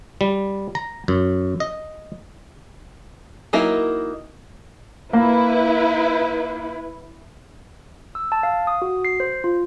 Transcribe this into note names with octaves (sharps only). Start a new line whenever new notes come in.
G3
A#5
F#2
D#5
F#3 A#3 D#4 E4 A#4
A#3 E4 B4
E6
A5
F5
D#6
F#4
C7
C5
F4